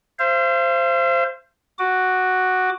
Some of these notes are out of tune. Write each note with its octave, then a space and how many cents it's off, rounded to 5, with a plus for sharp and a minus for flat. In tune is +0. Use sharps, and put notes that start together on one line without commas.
C5 +0 F5 -45
F#4 +0 D6 +25